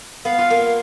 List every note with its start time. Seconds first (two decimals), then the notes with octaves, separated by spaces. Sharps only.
0.25 B3 F5
0.38 F4
0.50 A#3